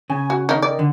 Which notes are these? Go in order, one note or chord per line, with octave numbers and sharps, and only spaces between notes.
C#3 G#5
F#4
D#3 C#4 D#4
D#3 D5
D3